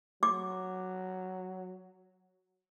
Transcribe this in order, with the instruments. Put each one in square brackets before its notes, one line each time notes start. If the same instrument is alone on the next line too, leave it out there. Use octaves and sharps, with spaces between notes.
[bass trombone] F#3 [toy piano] D6